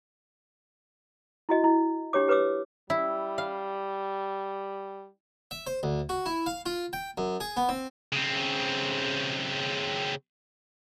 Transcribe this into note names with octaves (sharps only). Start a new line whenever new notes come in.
E4 F#4 D#5
E4
D4 G4 C#5 D6
G4 B4 C#5 D6 E6
G3 E4
F5
E5
C5
D2
F#4
E4
F5
F4
G5
F#2
G#4
B3
C4
C#3 C4